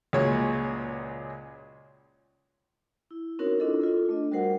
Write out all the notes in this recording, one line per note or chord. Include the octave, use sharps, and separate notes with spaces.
C#2 A#2 F#3 G#3 C#5
E4
C4 C#4 D#4 F#4 A#4 C#5
C4 D4 E4 F4 A4 D#5
F4 A4
A3 D4 D#5
G3 F#4 A#4 C5 F#5